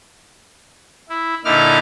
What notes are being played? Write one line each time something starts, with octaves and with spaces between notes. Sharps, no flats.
E4
A#2 D3 D#4 E4 D6 F6